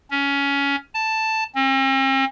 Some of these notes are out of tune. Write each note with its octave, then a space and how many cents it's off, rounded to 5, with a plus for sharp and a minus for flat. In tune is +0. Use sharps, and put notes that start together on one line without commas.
C#4 +15
A5 +5
C4 +45